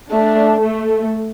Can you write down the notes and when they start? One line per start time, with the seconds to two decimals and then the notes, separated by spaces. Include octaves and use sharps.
0.11 A3 D4
0.60 A3